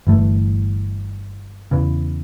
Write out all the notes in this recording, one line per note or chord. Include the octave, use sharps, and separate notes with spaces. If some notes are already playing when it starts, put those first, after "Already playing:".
G1 G2 E3 A3
E2 C#3 E3